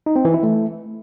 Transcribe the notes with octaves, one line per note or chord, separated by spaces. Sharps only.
D#4
C4
E3
E4
A3